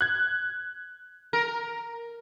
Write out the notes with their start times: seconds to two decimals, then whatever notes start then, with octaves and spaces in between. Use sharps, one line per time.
0.01 F#6 G#6
1.33 A#4